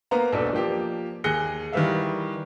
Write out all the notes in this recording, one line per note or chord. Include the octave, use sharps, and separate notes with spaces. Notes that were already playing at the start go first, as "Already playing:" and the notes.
A#3 B3 B4 C5 F5 A#5
E1 B1 D4 A4
F3 A#3 G4
D#2 G#4 F#6 A#6 C#7 G7
D#3 E3 G3 B4 E5 F5